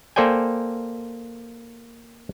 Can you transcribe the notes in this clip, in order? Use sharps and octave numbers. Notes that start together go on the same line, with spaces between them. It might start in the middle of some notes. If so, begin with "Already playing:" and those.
A#3 A4 C5 D5 G5 G#5